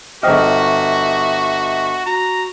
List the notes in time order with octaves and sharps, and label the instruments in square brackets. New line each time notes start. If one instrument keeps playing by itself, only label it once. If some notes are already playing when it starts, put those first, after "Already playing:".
[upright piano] G1 D#5 [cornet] F#4 [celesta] C5 G5 F6 [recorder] E5
[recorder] F#4 [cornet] A#5